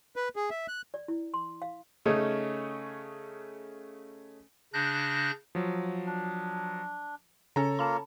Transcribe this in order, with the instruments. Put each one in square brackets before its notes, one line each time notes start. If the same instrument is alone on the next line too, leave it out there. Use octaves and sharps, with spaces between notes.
[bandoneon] B4
G#4
E5
F#6
[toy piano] D5
E4
C6
F5
[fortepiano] C#3 A3 C#4 D#4
[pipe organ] C#3 D4 F#6 G6 A#6
[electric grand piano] F3 F#3
[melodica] D4
[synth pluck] C#3 C#4 [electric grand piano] A4 C#5 A#5
[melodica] A#3 F4 [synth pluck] A5 B5